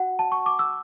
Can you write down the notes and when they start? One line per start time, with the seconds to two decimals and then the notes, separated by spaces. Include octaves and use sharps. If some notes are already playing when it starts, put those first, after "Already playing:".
Already playing: F#4 F#5
0.19 A5
0.32 C#6
0.46 D6
0.59 E6